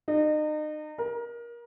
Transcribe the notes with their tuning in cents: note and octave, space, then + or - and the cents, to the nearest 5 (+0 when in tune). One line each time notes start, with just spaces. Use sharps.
D#4 -35
A#4 +25